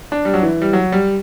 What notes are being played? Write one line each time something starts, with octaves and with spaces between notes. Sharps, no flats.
D4
G3
F#3
E3
G3
F#3
G3